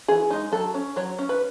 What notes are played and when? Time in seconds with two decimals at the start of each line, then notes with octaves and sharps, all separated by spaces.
0.08 E3 G#4
0.30 G#3 D#4
0.52 F#3 A4
0.74 C#4
0.96 F#3 C#5
1.19 C#4
1.29 B4